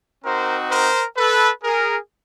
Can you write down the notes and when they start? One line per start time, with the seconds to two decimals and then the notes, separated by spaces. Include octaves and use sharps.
0.24 C4 D#4 F#4 A#4 C5
0.70 A#4 C5
1.17 A4 B4
1.64 G#4 A#4